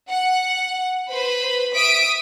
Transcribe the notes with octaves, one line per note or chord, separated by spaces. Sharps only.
F#5
B4 C5 B5
E5 D#6 B6 D7